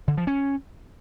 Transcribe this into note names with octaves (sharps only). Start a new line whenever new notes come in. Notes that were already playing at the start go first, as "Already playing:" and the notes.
D3
F3
C#4